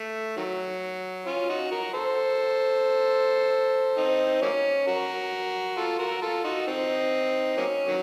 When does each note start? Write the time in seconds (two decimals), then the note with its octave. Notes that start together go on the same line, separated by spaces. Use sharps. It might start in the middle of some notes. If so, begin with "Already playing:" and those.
Already playing: A3
0.37 D#3 F#3
1.26 C#4 F4
1.49 D#4 F#4
1.71 F#4 A#4
1.94 A4 C5
3.97 C4 D#4
4.42 F#3 A#3 C#4
4.87 F#4 A#4
5.77 F4 A4
5.99 F#4 A#4
6.22 F4 A4
6.44 D#4 F#4
6.67 C4 D#4
7.57 F#3 A#3 C#4
7.87 D#3 F#3